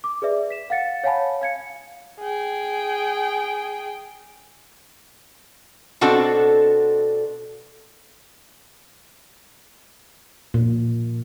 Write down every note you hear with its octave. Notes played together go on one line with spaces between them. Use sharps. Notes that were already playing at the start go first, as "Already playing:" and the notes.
D6
G#4 B4 D5 E5
B6 E7
F5 F#5 A6 C#7
C#5 F5 F#5 G#5 A5 B5
F5 G#6 C#7
G#4 G5
B2 C4 D4 F#4 A4
A#2